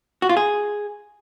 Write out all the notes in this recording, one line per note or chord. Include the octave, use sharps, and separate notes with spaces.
F#4
F4
G#4